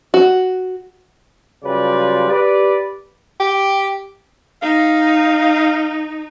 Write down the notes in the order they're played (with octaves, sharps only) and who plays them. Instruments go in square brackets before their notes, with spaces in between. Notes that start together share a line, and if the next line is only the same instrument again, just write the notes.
[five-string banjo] F#4
[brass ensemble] C#3 F#3 G3 F4 B4 D5
G4 B4 D5
[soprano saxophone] G4
[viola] D#4 [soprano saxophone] F5